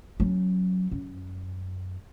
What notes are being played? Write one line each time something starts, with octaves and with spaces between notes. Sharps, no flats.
F#3 C#4
F#2